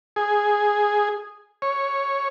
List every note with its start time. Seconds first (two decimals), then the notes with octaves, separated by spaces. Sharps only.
0.16 G#4
1.62 C#5